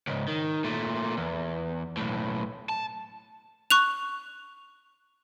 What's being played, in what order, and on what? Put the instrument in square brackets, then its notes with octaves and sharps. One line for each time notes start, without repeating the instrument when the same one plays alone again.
[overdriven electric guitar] C#2 G#2
D#3
A#2 A3
E2
B1 A2
A5
[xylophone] C#6 F#6 F7